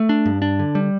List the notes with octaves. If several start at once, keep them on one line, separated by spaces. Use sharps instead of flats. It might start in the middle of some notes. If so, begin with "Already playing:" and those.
Already playing: A3
D4
G2
D4
D3
G3